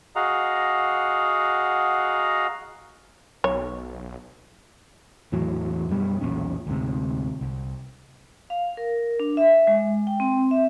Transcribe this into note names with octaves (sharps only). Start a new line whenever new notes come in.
F#4 G#4 D#5 F5 F#5 A#5
B1 C#5
E2 A2 E3 F#3
F#2 B2 G3
B1 E2 A#2 C#4
D2 G#2 C3
C2
F5
A#4
D4
E5
G#3
G5
C4
E5